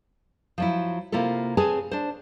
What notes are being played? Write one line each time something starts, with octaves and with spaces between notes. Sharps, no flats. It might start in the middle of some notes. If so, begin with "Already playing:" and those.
F3 F#3 E4
C3 A#3 E4 F4 A4
C4 G#4 B4 C#5 G#5 A5
D4 C5